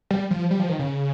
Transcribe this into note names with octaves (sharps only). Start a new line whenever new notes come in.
G3
F3
G3
F3
D#3
C#3